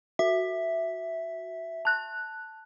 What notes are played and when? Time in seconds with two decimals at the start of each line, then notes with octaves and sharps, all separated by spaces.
0.19 F#4 E5
1.85 A5 F#6